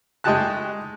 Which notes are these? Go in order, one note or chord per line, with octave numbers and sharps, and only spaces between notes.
G#3 A3 D#4 G4 A5 F#6